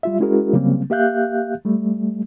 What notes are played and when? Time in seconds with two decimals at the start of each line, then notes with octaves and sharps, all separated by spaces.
0.03 G3 F4 E5
0.20 G#3 C#4 E4 F#4 G#4 A#4
0.53 C#3 F#3 G3 A#3 C4
0.90 A#3 G4 E5 F5 F#6 G6
1.65 G3 A3